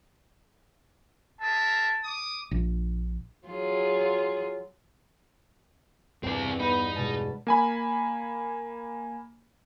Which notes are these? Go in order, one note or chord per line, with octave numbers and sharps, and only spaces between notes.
G#4 A#4 E5 A5
D6 D#6
A#1
F#3 F4 G#4
E2 G2 C4 D5
B3 D#4 B4 B5
B2 G#3 A5
A#3 G#5 B5